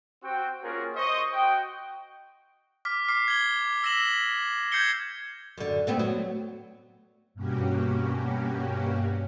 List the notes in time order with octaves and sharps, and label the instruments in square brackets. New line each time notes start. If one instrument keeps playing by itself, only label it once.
[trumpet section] C4 F#4 G5
A#3 C#4 F4 F#4 G#4 A#4
C5 D#5 C#6
F#4 D#5 F#5 G5
[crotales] D6 F6 B6
D6 F6 C7
G#6 G7
E6 A#6 B6 E7 F#7
G6 G#6 C7 C#7 G7
[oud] F#2 D3
A3 B3 C4
F#3
[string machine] G2 B2 A#3 C#4 F#4 G4